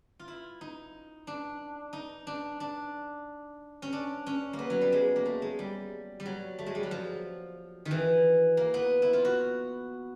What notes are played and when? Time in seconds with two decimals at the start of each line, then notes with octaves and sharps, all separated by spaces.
0.19 F4
0.28 E4
0.61 D#4
1.27 D4
1.93 D#4
2.27 D4
2.60 D4
3.82 C#4
3.93 D4
4.26 C#4
4.53 A#3
4.59 B3
4.70 F#3
4.81 G3
4.92 G#3
5.16 A#3
5.26 A3
5.42 G#3
5.59 G3
6.20 G3
6.26 F#3
6.59 A3
6.66 G#3
6.75 G3
6.83 F#3
6.91 F3
7.85 D#3
7.91 E3
8.57 A#3
8.74 B3
9.02 E4
9.13 F4
9.25 F#4